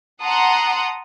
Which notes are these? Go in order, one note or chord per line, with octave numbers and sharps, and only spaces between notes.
F#5 A5 A#5 C6 D#6 F#6